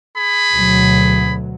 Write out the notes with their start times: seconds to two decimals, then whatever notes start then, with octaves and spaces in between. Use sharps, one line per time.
0.17 G#4 B5
0.52 D2 B2 F#3